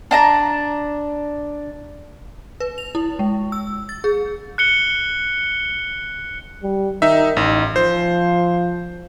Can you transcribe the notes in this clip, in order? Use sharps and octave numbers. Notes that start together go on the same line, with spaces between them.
D4 A5 A#5
B4
F7
E4
G#3
E6
A6
G#4
F#6 C#7 G7
G3
D#3 D#4 E5
A1 D#4
F3 C5